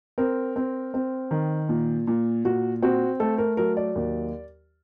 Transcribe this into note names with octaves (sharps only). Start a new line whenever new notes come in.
C4 A#4
C4
C4
D#3
A#2
A#2
A#2 F#4
C4 F#4
A3 A4
A#4
F#3 A#4
D5
D#2